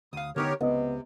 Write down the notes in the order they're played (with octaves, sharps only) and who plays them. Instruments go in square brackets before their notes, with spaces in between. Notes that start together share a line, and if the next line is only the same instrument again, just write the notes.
[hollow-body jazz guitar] D2 F5 [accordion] D#6
[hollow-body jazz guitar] D3 B3 D#4 [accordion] G4 A#4 C#5
[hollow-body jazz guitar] C#2 [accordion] C3 [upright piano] B3 D#5